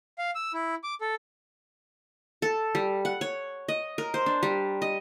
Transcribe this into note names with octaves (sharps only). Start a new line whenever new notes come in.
F5
E6
E4
D6
A4
A4
G3
F#5
C#5
D#5
A#4
C5
D4
G3
D#5